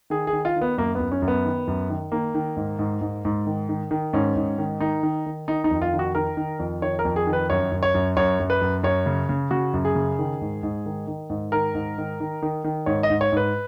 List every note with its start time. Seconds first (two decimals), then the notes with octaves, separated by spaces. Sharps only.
0.10 D#3 G#4
0.27 G#4
0.33 D#3
0.45 F4
0.56 D#3
0.61 B3
0.78 F#2 A#3
0.95 F#2 B3
1.12 C#4
1.22 F#2
1.28 B3
1.45 D#3
1.68 F#2
1.90 D#3
2.12 D#3 A#3
2.35 D#3
2.56 G#2
2.79 G#2
3.01 G#2
3.25 G#2
3.47 D#3
3.69 D#3
3.91 D#3
4.13 G#2 C#4
4.36 G#2
4.58 D#3
4.80 D#3 D#4
5.03 D#3
5.26 D#3
5.48 D#3 D#4
5.64 D#4
5.71 F2
5.82 F4
5.93 D#3
5.99 F#4
6.15 D#3 A#4
6.37 D#3
6.59 F2
6.82 D#3 C#5
6.99 A#4
7.05 F2
7.16 G#4
7.27 D#3
7.33 B4
7.50 F#2 C#5
7.72 F#2
7.83 C#5
7.94 F#2
8.17 F#2 C#5
8.40 F#2
8.50 B4
8.61 F#2
8.83 F#2 C#5
9.06 C#3
9.29 C#3
9.51 C#3 F#4
9.74 F#2
9.85 G#4
9.95 C#3
10.19 D#3
10.41 G#2
10.63 G#2
10.86 D#3
11.07 D#3
11.30 G#2
11.52 D#3 A#4
11.74 G#2
11.98 D#3
12.20 D#3
12.42 D#3
12.64 D#3
12.86 G#2 C#5
13.03 D#5
13.10 G#2
13.21 C#5
13.32 G#2 B4